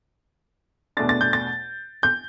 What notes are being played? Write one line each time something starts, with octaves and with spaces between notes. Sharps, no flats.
E2 B2 A3 D4 A6
A6
G6
A6
G6